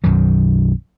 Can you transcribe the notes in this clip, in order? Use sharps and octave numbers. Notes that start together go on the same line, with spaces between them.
B1 F#2 D#3 F#3